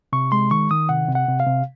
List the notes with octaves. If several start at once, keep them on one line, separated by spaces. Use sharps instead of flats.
C3 C#6
G#3 C6
D#3 C#6
D#3 D#6
C3 F#5
C3
F#5
C3
F5
C3